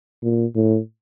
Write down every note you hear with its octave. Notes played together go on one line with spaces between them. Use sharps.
A#2
A2